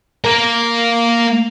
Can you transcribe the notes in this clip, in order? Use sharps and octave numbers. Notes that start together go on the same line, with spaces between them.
A#3 A#4